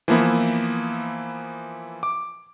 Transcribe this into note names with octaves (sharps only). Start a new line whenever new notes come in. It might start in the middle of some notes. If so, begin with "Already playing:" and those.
E3 F3 A#3 B3 E4
D6